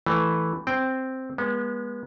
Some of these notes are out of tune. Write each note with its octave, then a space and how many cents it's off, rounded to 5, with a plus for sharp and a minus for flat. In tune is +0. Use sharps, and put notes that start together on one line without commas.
E3 +0 A3 +0 A#5 +0
C4 +0 G5 +0
G#3 -15 B3 -35